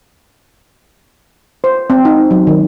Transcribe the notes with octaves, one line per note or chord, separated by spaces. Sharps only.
C5
C4
D#4
F#3
D#3